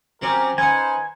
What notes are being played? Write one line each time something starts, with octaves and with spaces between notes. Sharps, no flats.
F#3 C4 C#4 G4 A#4
C#4 D#4 B4 C5 F#5 G#5